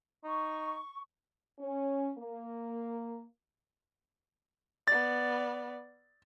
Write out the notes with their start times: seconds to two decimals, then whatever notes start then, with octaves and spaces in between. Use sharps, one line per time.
0.24 D#4 C#6
1.59 C#4
2.18 A#3
4.88 B3 D5 A6